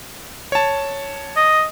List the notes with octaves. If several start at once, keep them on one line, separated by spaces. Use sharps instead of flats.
C#5 A5
D#5